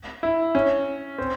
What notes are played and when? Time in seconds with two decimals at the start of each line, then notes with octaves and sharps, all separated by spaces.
0.23 E4
0.55 C#4
1.18 C4